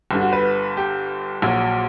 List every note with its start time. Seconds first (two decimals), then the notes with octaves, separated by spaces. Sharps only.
0.11 G1 G2 D3
0.21 F#4
0.33 B4
0.77 G4
1.42 A#1 A#2 F#3 F#4